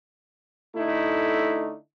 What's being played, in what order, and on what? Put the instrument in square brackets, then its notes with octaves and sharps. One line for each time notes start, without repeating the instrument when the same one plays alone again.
[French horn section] D3 A3 D#4 E4